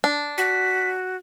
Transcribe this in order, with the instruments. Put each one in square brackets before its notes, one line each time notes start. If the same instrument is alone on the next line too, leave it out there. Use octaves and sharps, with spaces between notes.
[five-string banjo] D4
[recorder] F#4 [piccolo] B6